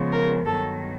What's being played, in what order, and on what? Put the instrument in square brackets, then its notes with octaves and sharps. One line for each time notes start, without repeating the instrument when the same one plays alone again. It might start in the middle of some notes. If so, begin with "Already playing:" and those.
Already playing: [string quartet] C#3 F3 G#3 B3
A#4
G2 D#3 F#3 B3 A4